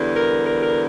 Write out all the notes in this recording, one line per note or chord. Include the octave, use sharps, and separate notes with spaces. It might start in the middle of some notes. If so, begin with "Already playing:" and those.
Already playing: E2 D3 G3
A#4
A#4
A#4